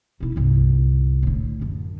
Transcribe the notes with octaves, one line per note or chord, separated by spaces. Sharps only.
B1 E4
G1 C2
A2 D3
F#2 D3